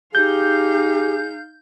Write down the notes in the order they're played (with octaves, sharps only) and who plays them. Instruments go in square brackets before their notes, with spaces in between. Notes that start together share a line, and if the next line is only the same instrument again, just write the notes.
[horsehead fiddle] D#4 F5 [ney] G4 [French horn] G#4 [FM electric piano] G6